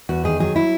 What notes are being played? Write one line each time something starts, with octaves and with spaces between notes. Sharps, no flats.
E2 F#4
D#3 G#4
F#3 G#4
E4